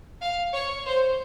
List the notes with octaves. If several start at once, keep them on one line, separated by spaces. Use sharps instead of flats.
F5
C#5
C5